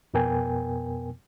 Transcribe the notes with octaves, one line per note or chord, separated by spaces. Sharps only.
F2 B2 B3 A#4 G5 G#5